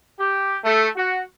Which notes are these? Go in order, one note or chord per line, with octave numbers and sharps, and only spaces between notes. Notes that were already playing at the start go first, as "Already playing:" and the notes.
G4
A3
F#4